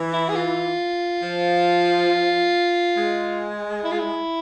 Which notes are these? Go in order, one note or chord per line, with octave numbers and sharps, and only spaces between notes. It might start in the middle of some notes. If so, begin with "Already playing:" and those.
Already playing: E3
E4
G#4
F4
F3
G#3
E4
F4
E4